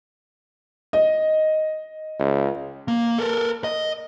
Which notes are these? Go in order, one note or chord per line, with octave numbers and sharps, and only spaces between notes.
D#5
C#2
A#3
A4 A#4
D#5